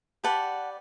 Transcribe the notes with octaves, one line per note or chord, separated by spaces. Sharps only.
G4 B4 D5 F#5 A5